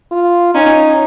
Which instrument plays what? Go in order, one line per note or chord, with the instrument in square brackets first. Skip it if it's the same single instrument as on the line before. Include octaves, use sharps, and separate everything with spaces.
[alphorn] F4
[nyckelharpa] C#4 [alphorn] D#4